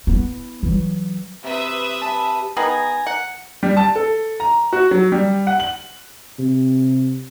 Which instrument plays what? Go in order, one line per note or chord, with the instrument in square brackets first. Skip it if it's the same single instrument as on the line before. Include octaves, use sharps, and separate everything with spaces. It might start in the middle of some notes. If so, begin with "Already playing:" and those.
[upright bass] B3 E4
E3 F#3
[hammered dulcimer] C3 [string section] B4 E5 D#6
[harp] A5 B5
[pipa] D#3 B3 G#4 [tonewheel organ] G#5 A#5
[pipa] F#5
[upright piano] G3
A5
A4
A#5
F#4
F#3
G3
F#5
F#7
[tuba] C3